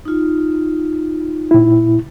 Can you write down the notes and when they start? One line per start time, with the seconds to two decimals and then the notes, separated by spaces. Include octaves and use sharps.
0.05 D#4 F4
1.51 A#2 E4